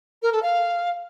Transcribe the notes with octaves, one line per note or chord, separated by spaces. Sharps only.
A#4
A4
F5